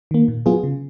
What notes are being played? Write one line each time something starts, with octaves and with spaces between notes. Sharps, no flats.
D#3 A#3
A#2
F#3 B3 F4 G#4
C#3